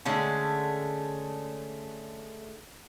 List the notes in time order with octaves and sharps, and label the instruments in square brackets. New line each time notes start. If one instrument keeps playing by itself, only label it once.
[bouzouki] D3 G#3 A3 C#4